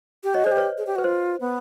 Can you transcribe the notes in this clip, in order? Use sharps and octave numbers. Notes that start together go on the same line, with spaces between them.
G4
F#4 C#5 D#5
G#4 C5 D5
G4
B4 C#5
G#4
G4
F#4 B4
F4 C5
B3